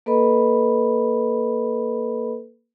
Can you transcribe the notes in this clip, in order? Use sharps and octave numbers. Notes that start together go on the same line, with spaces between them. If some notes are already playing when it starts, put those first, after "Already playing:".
A#3 A4 B4 D#5 B5